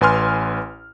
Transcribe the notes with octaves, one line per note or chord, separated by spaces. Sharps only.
A1 B4 G#5 C6 F6